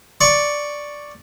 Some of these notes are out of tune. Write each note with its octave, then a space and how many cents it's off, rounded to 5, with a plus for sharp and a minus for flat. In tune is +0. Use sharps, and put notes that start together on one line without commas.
D5 +0 C#6 +0